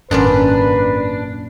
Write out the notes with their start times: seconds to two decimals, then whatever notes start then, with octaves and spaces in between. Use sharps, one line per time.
0.11 G#1 F#2 A#2 D4 B4 D5